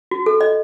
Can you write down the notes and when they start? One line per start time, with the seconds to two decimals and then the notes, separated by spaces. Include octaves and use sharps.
0.11 F#4
0.26 A4
0.41 D#5